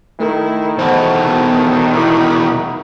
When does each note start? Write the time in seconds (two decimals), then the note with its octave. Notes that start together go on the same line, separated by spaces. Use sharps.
0.20 D#3 A3 E4 A4 A#4
0.78 E2 B2 A4 C5 F#5
1.96 E4 B5 D6 D#6